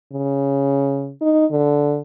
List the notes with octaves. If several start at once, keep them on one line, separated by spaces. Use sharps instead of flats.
C#3
D#4
D3